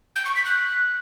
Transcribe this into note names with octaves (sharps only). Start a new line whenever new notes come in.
G6
C#6
B6
F#6